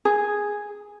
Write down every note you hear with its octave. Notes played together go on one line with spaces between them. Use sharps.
G#4